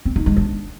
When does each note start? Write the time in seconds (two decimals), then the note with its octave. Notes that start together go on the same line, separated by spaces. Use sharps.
0.05 C4
0.16 D#4
0.26 G#3
0.37 D4